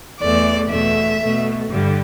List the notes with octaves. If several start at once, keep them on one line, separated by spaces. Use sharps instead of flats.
E2 E3 A3 D5
E2 B2 A3 E5
B2 A3
G2 D3 G3